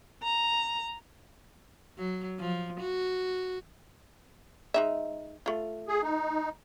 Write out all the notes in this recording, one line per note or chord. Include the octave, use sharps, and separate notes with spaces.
A#5
F#3
F3
F#4
G#3 D#4 E5
A3 F4
G#4
D#4